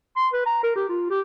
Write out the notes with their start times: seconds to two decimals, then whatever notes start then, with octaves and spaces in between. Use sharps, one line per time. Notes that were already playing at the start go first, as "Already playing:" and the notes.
0.16 C6
0.33 B4
0.46 A#5
0.63 A#4
0.75 G4
0.89 F4
1.10 G4